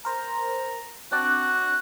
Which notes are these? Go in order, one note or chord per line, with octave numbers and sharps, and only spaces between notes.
A#4 C5 A#5
C4 D4 F#4 D5 F#6